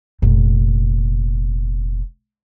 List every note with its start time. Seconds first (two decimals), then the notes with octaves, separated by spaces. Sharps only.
0.22 F1 A#2